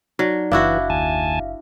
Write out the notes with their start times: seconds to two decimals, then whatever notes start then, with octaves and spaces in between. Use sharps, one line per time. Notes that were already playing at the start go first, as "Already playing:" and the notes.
0.19 F#3 D#4 D5
0.52 F#1 E3 D4 E4 F#4 E5 F5
0.90 D#2 G#5 A5